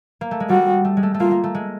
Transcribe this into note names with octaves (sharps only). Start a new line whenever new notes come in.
A#3
A3
G#3
G3 F#4
A3
G#3
A3
A3
A#3 F4
A#3
A3
G#3